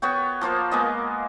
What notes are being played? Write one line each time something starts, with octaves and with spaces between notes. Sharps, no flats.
B3 F#4 C#5 G5
F3 A#3 F4 C5
G#3 A#3 B3 D#5